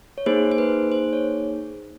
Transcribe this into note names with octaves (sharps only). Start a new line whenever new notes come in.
C#5
A#3 D#4 G#4 C5
C5
B4
C5
C#5